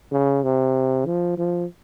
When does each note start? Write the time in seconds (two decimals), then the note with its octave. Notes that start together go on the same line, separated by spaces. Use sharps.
0.11 C#3
0.43 C3
1.06 F3
1.38 F3